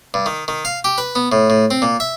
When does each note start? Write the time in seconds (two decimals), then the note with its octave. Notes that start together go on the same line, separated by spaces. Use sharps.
0.14 G2
0.26 D#3
0.48 D#3
0.65 F5
0.84 G4
0.98 B4
1.15 B3
1.32 A2
1.50 A2
1.71 C4
1.82 A#2
2.00 E5